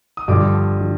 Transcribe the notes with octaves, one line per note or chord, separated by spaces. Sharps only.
D#6
G2 D3 F3 D6
D3 F3